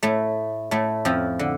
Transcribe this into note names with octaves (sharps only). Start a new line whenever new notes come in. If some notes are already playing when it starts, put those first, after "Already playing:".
A2 A3
A2 A3
F2 F3
D3